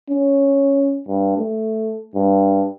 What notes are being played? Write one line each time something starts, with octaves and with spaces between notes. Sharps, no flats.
C#4
G2
A3
G2